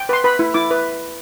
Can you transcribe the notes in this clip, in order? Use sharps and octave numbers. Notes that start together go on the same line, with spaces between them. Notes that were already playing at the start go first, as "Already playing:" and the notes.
Already playing: G5
B4 C6
B4 B5
E4
E4 D6
B4